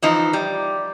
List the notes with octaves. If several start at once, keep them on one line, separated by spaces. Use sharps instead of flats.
E3 F3 D#4
G3